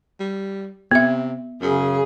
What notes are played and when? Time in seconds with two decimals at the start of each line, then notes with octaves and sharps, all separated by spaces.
0.20 G3
0.91 C3 B3 E5
1.62 F#2 C#3 G#4